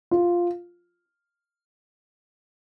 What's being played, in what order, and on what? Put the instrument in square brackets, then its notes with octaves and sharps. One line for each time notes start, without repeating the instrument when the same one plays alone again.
[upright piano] F4